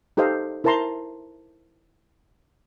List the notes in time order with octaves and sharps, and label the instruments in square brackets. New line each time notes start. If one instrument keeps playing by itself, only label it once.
[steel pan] D#4 G4 A4 C5 D#5 F5
E4 A#4 C5 A5 A#5 C6